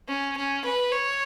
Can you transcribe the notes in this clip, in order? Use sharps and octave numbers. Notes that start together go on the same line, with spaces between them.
C#4
C#4
B4
C#5